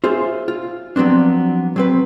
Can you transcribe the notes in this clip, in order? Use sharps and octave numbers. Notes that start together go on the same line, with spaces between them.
F4 G#4 C5 E5
F4
F3 F#3 B3 C4 D4
F#3 C4 B4